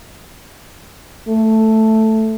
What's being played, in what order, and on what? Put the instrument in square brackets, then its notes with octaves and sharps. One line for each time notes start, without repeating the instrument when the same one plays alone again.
[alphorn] A3